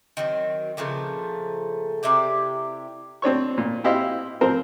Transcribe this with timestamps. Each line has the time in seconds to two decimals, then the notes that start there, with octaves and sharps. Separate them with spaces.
0.17 D#3 F#3 C4
0.77 A#2 C#3 F3 A3
2.03 C3 E4 G4 D5
3.22 C4 D4 C#5 C#6
3.58 A#2
3.84 C4 E4 G4 C5 D#5 F5
4.41 F3 C4 A#4 C5